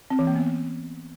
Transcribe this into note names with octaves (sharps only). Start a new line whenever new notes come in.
C4
E3
A#3
B3